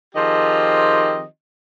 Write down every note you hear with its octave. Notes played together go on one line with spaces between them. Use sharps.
D#3 F3 C4 G4 G#4 D#5